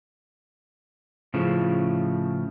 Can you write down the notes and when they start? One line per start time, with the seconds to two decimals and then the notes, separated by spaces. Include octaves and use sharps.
1.34 A2 C#3 F3